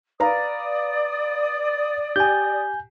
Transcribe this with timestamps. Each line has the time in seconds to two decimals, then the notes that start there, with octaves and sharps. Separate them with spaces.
0.20 B4 D5 F5 A#5 D#6
2.16 G4 G#5 G6